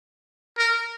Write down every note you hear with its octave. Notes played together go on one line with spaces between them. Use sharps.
A#4